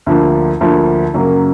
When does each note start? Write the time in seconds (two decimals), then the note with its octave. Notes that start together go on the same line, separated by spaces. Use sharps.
0.06 D2 D3 F3 A#3
0.61 D2 D3 F3 A#3
1.14 F#2 C#3 F#3 A#3